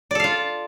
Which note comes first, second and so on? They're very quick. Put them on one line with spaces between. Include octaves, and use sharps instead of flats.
D5 A4 F5 F4